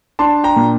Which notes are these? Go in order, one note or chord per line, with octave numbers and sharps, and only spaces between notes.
D4 A5 C6
G5 A#5
A#2